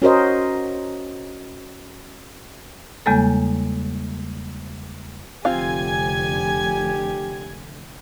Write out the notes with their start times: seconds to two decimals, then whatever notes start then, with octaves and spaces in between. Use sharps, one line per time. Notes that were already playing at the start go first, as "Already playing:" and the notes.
0.02 C#4 F#4 A#4 C5 D#5
3.06 E2 C#3 G3 G#3 A#3 A4
5.45 F1 D3 C4 F4 G4 F5 G#5 G#6